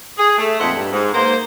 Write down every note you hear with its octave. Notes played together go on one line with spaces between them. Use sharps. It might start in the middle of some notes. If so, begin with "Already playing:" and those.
G#4
A3
F2 A#2 D#4 C5 E5 F#5
G2
G#2
A#3 B3 C5